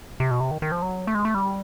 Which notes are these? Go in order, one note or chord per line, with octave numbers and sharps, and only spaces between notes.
C3
B2
C3
D#3
D#3
F3
F#3
A3
G#3
A3
G3